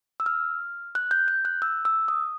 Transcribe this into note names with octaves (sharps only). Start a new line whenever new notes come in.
E6
F6
F#6
G6
G6
F#6
E6
E6
D#6